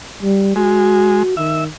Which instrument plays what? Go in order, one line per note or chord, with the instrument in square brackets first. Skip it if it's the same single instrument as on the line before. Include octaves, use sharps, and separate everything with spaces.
[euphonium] G3
[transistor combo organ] G#3 [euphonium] F#4
[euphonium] D#3 [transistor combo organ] E5